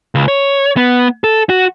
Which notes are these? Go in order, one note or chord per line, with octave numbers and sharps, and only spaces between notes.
C#2
C#5
B3
A4
F#4